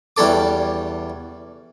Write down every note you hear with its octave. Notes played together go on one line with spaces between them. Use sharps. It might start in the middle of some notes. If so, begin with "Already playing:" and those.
E2 G3 C#4 A4 D6